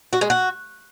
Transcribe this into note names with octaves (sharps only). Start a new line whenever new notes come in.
F#4
G#3
F#4